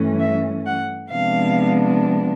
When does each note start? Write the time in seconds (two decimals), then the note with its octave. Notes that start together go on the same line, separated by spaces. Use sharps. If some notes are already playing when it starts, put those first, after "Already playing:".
Already playing: G2 E3 A3 C#4
0.20 E5
0.66 F#5
1.11 C3 F3 G#3 B3 D4 F5